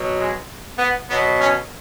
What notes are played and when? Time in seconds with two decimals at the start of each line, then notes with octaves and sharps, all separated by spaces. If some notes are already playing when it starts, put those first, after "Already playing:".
Already playing: B2 F#3
0.18 G#3
0.78 B3
1.09 B2 F#3 B3
1.39 C#4